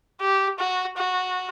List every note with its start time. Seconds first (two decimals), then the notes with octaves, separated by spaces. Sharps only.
0.21 G4
0.59 F#4
0.97 F#4